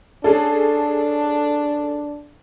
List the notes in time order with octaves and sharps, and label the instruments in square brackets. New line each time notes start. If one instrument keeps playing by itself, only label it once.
[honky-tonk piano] C#4 G#4 A4 [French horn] D4